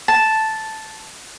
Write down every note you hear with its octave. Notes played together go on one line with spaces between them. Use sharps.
A5